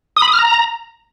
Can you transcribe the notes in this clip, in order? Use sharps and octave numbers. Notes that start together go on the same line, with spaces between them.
D#6
B5
D#6
F6
A#5